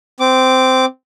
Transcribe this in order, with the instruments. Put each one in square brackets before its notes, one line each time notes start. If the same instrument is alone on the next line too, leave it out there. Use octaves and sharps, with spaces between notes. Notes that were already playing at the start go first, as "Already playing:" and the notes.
[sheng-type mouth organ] C4 D6